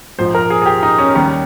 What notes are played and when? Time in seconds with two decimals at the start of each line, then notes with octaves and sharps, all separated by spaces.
0.19 A#1 G#2 F3 C5
0.35 A#4
0.50 G#4
0.62 G#4
0.66 G4
0.83 D#4
0.98 C#4
1.14 D#2 D#3 G3 C#4